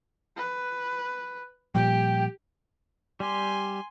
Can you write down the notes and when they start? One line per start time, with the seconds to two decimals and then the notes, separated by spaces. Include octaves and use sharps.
0.37 B4
1.75 A#2 F3 G3 G4 G5
3.20 G3 G4 G#5 C6